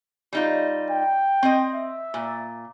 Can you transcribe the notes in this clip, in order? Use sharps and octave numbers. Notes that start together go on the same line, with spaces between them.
G3 D#4 F4
G5
C4 D#5
E5
A#2